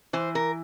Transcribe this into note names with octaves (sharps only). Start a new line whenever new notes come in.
E3 C5
A#4